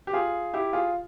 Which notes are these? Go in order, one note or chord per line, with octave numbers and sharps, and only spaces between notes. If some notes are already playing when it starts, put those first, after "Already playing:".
G4
F4 G#4
E4 G4
F4 G#4